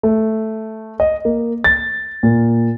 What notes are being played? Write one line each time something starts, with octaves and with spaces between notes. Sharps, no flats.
A3
D#5
A#3
A6
A#2